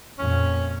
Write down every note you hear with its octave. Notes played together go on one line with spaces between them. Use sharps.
F2 A#2 C#4